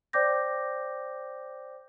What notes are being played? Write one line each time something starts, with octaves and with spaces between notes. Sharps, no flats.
C5 D5 G5 D6 G6 A#6